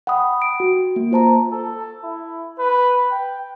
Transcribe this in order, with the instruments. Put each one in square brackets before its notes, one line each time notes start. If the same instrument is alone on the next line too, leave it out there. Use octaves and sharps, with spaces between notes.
[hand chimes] F#5 G5 B5 D#6
D7
F#4
A#3
F4 C5 A5 A#5
[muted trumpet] A4
E4
B4
G5